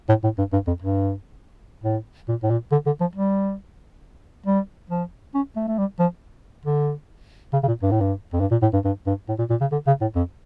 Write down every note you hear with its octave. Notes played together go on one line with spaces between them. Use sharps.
A2
A2
G2
G2
F2
G2
A2
A#2
A2
A#2
D3
D3
F3
G3
G3
F3
C#4
A3
A3
G3
F3
D3
C#3
C#3
A#2
G2
A2
G2
F2
G2
A#2
A2
G2
G2
G2
A2
A#2
A#2
C#3
D3
C#3
A2
F2